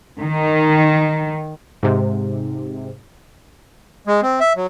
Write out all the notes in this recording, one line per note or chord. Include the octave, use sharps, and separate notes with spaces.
D#3
G#2 C3
G#3
C4
E5
F#3